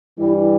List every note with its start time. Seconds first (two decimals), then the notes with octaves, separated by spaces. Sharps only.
0.18 G2 E3 G3 E4
0.39 E4